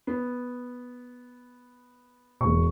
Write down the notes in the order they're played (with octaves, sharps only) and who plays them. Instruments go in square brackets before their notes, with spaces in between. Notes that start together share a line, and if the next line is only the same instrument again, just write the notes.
[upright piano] B3
[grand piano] E1 C#6 [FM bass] B2